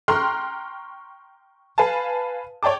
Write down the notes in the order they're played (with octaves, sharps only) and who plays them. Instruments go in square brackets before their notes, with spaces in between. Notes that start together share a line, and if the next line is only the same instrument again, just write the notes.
[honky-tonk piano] G5 A#5 C6 C#6 F6 F#6
B4 F5 G#5 A5
C#5 D5 G5 A5 D6